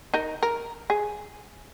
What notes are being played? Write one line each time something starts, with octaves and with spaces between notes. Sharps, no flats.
D#4 A#4
A#4
G#4